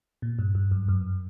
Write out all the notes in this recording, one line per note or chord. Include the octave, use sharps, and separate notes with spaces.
A#2
G2
G2
F#2
F#2